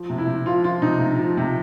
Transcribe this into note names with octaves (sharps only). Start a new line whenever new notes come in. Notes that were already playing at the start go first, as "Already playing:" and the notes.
Already playing: F3
C3
E4
C3
F3 F4
F3 F4
C3 D#4
C3
F3
C3